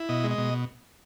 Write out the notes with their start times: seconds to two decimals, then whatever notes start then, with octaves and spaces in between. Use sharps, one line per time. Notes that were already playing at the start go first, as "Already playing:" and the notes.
Already playing: E4
0.09 B2 D#5
0.24 G#3
0.31 D#5
0.38 B2